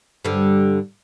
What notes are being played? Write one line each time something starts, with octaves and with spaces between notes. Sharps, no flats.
G2 D3